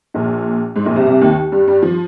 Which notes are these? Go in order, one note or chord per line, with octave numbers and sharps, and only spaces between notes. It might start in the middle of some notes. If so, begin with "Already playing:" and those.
A#1 A#2
G#2
A#1 A#2
C2 C3
C2 C3
D#2 D#3
G2 G3
G2 G3
F3